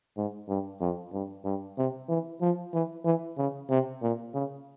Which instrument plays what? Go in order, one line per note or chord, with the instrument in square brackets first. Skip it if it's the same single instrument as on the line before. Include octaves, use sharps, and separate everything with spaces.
[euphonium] G#2
G2
F2
G2
G2
C3
E3
F3
E3
E3
C#3
C3
A#2
C#3